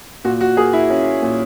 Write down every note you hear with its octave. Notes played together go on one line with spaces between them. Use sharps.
A#2 F#4
F#4
A#3 G#4
E4
C#4
A#2